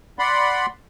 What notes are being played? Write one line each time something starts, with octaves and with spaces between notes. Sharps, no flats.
D5 F#5 B5 C6